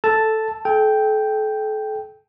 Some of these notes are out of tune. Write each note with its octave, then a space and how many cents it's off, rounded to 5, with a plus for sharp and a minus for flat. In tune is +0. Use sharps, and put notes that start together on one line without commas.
A4 +0 A5 +0
A4 -35 G5 +0